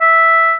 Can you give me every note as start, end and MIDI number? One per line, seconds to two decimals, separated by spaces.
0.01 0.55 76